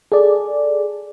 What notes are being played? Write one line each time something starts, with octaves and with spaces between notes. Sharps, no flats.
G#4 A4 D5